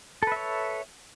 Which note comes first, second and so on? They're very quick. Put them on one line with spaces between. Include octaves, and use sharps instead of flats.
A4 B4 E5 C#5